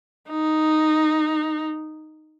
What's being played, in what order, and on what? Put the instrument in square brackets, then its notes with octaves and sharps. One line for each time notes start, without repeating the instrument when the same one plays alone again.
[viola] D#4